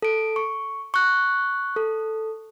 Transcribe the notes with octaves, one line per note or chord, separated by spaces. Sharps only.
A4 D7
C#6
C#6 F#6
A4